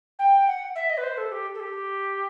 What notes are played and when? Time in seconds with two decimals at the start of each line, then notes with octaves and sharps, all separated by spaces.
0.19 G5
0.47 F#5
0.75 E5
0.89 D#5
0.97 B4
1.03 C5
1.17 A4
1.31 G4
1.54 A4
1.60 G4